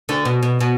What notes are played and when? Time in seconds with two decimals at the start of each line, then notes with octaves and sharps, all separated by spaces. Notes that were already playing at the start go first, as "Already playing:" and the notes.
0.09 D2 D3
0.25 B2
0.43 B2
0.61 B2